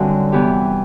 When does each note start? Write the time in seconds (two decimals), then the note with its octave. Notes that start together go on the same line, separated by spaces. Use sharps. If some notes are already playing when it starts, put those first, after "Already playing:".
Already playing: F#2 D3 G3 C4
0.32 C3 E3 B3 E4 G4